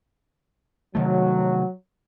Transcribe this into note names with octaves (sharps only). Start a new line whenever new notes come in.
C3 D#3 F#3 A3